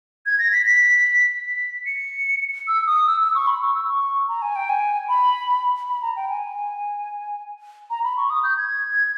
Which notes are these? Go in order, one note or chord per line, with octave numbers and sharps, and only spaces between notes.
G#6
A#6
B6
B6
B6
C#7
E6
D#6
E6
E6
C#6
B5
C#6
E6
C#6
A#5
G#5
G5
G#5
B5
B5
A#5
G5
G#5
A#5
B5
C#6
D#6
G6
G#6